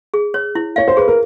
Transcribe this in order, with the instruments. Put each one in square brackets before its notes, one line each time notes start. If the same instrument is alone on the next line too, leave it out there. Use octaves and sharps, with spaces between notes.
[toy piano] G#4
C#5
E4
[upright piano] C#5 [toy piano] F5
[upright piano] C5
[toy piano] G#4 [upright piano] B4
[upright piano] A#4